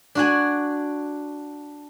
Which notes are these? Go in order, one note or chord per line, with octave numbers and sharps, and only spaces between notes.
D4 F#4 G#5